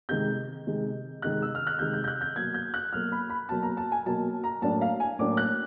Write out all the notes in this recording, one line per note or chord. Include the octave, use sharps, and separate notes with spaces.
C3 D#3 G#3 G6
C3 D#3 G#3
C3 D#3 G#3 F#6
E6
F6
F#6
C3 D#3 G#3 G6
G6
G6
F#6
G6
B2 F#3 A#3 G#6
G6
F#6
B2 F#3 A#3 F6
B5
B5
B2 F#3 A#3 A5
A#5
A5
G#5
B2 F#3 A#3 A5
A#5
A2 F#3 A#3 D4 A5
F5
G#5
A2 F#3 A#3 D4 D6
F#6